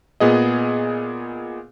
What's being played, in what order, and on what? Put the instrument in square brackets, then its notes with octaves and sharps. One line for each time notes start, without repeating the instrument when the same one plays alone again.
[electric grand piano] A#2 B3 G#4 D#5